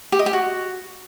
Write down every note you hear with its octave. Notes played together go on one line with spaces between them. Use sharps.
G4
D#5
G4
F#4